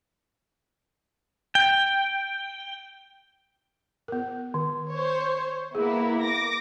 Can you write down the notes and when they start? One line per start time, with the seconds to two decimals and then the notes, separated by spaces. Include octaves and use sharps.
1.55 G5
4.08 B3 A#4
4.54 D#3
4.90 C5 C#5
5.75 A#3 B3 E4 G#4
6.22 D6 A#6